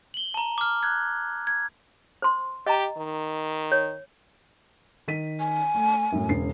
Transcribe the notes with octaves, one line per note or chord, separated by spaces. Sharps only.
F#7 G7
A5 A#5
D6 F6
F#6 G#6
G#6
C5 C6
G4 D#5 A#5
D#3
C#5
D#3 B6 D#7
G#5
A3
F#2 A2
E1 C#3 C7